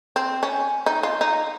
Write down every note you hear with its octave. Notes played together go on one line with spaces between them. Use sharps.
C4
C#4
D#4
F4
D#4